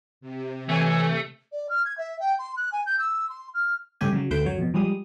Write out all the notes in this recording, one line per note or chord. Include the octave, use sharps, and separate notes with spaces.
C3
E3 G#3 A3 C#5 G#5
D5
F6
G#6
E5
G5
C6
F#6
G#5
G6
E6
C6
F6
G2 C#3 A3 G4 G#5
C#3 F#3
D2 A3 B4 C5 G5 G6
F#2 F#3 C#5
F2 B2
F3 G3 G#3 D#6